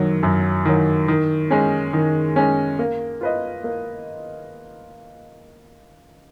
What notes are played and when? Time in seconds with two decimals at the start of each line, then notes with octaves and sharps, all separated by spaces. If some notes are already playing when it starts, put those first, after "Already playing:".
Already playing: F#2 D#3 F#3
0.23 F#2
0.65 D#3 F#3
1.08 D#3
1.51 G#3 C#4
1.93 D#3
2.36 G#3 C#4
2.79 A#3
3.21 F4 B4 D#5
3.64 A#3